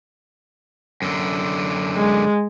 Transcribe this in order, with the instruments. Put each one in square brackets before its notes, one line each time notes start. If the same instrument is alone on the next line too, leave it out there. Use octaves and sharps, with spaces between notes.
[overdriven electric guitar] F#2 D3
[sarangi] G#3